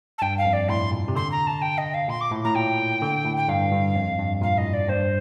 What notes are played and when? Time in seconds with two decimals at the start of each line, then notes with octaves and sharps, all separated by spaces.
0.18 A5
0.22 G2 G5
0.37 F5
0.45 F2
0.53 D5
0.69 A2 C6
0.92 A#2
1.08 C3
1.15 D3 C6
1.31 A#5
1.46 A5
1.61 G5
1.77 D#5
1.93 F5
2.08 A#2 C6
2.20 D6
2.32 A2
2.44 A2 A#5
2.55 A#2 G5
3.02 D3
3.25 A2
3.37 G5
3.48 G2 F5
3.72 G2
3.95 F2
4.19 G2
4.42 A#2 F5
4.57 A2 D#5
4.73 D5
4.88 G2 C5